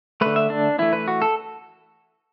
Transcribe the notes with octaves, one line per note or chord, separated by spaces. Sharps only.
D3 A3 B4
E5
D4
E3 A3 E4
B4
F#4
A4